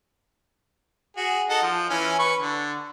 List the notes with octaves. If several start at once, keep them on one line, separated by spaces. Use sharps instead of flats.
F#4 G#4
D#4 A4 F#5
F3
E3 C#4 G#5
B4 C#6
D3